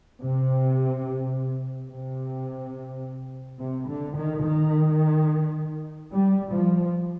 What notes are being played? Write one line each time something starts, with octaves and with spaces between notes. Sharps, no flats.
C3
C3
C3
D3
D#3
D#3
G3
F3